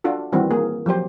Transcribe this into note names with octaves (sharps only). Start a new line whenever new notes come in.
D4 F4 F#4 A4
D#3 E3 G3 C4 F#4
A#3 G#4
F3 F#3 G4 C5